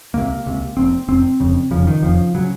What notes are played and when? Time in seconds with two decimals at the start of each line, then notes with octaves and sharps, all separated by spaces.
0.14 C#2 C3 A#3
0.46 C#2 C3
0.77 F1 F2 C3 C4
1.08 F1 F2 C3 C4
1.40 F1 F2 C#3
1.71 F1 F2 C#3 F3
1.87 D#3
2.02 F1 F2 C#3 F3
2.35 C#3 F#3